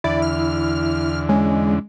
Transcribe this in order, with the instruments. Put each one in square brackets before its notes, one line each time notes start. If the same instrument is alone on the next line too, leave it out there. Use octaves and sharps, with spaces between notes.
[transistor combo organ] E2 D3 [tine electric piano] E4 [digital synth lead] D5
[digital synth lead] F6
[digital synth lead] G#3 [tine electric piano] C#4